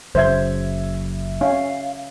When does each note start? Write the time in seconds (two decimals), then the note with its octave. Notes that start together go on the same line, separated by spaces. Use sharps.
0.15 F#1 F#2 C#3 C5 E5 G#6
1.41 C#4 F5